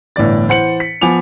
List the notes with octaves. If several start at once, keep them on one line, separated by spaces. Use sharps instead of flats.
G1 A2 E3 D5 A6
E3 C5 F#5 C#7 F#7
B6
F3 B3 G#5 D6 F7